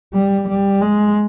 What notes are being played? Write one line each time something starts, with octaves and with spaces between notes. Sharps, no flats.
G3
G3
G#3